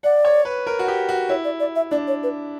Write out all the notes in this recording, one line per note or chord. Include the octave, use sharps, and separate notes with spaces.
D5 F#5
C#5
B4
A#4
F#4
G4
F#4
E4 C#5
D5
D5
E5
D4 D5
C#5
B4